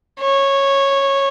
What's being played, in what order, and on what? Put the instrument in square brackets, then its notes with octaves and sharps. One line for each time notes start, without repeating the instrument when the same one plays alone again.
[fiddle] C#5